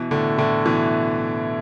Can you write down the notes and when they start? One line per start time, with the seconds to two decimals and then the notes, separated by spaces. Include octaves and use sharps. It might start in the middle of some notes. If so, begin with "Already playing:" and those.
Already playing: B2 E3
0.11 A2 D3
0.38 A2 D3
0.66 B2 E3